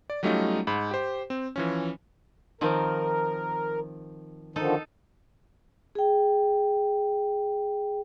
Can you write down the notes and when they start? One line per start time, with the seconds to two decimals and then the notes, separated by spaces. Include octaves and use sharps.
0.10 D5
0.23 F#3 G3 A3 C#4 D#4 F4
0.67 G#2 B5
0.91 G4 C5
1.30 C4
1.56 E3 F3 C#4
2.61 D#3 F3 C4 A#4
4.56 D3 D#3 F3 D#4 A4
5.95 G#4 G5